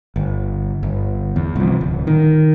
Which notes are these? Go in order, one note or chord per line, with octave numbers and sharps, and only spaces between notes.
G1
G1
E2
C2 F3
D1
D#3